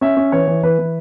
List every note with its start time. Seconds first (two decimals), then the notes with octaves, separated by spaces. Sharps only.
0.01 C#4 E5
0.17 C#4
0.32 E3 C#5
0.47 E3
0.63 E3 B4
0.79 E3